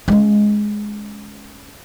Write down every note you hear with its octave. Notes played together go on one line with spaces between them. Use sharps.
G#3 C#4